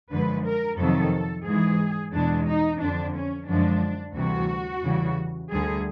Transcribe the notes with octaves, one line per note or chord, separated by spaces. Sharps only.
F#2 D3 F3 G#3 B4
A#4
F2 C3 D#3 F#3 A4
G#2 E3 G#3 G#4
E2 B2 G#3 D4
D#4
F2 D3 F3 D4
C#4
F#2 D3 F3 G#3 D4
D2 C3 E3 G3 F#4
E2 C#3 E3 G3
D2 D3 G3 G#4